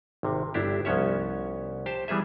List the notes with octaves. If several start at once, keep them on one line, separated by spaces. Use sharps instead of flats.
G#1 C3
G1 D4 E4 G4
C2 F3 B3 C#4 C#5 E5
G4 C5 A5
E3 G3 B3 G#4 E5